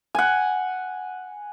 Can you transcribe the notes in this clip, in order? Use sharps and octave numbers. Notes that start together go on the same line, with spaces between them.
F#5 G#5